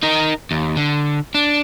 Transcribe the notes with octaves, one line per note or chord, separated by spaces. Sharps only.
D#4 A#4
D#2
D3
D4